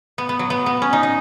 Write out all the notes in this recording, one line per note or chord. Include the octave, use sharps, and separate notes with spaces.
B3
B3
F#3
B3
B3
C#4
D#4
D#4